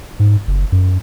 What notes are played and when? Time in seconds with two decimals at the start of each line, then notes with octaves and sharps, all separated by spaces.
0.19 G#2
0.47 F#1
0.72 F#2